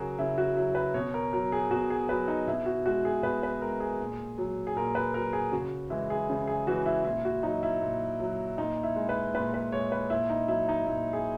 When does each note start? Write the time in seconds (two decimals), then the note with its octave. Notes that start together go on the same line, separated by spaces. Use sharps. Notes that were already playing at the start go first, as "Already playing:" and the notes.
Already playing: C#3 F#3 F#4 G#4 A#4
0.19 C#3 E4
0.38 F#4
0.56 F#3 E4
0.75 B4
0.94 B2 C#5
1.14 A#4
1.33 F#3 A#4
1.52 G#4
1.70 B2 F#4
1.90 G#4
2.09 F#3 B4
2.28 D#4
2.47 B2 E4
2.66 F#4
2.86 G#3 F#4
3.05 G#4
3.23 B2 B4
3.43 B4
3.62 G#3 A#4
3.80 G#4
4.00 A#2
4.38 F#3
4.67 G#4
4.76 A#2 A#4
4.95 B4
5.14 F#3 A#4
5.33 G#4
5.52 C#3 F#4
5.90 E3 G#3 E4
6.10 G#4
6.30 C#3
6.47 G#4
6.67 E3 G#3 F#4
6.86 E4
7.05 A#2 E4
7.25 F#4
7.43 F#3 D#4
7.63 E4
7.81 A#2
8.20 F#3
8.58 A#2 D#4
8.83 E4
8.96 G#3
9.09 B4
9.35 A#2 B4
9.54 B4
9.72 G#3 C#5
9.92 B4
10.10 A#2 E4
10.30 D#4
10.48 F#3 E4
10.69 D#4
10.86 A#2 E4
11.13 G#4